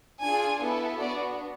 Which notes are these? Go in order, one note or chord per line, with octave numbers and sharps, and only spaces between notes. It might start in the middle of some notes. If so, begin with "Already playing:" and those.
D4 F4 G#4 G#5
B3 E4 A4
B3 D4 F#4 D5